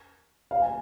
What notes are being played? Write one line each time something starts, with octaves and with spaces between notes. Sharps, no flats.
F5
G#5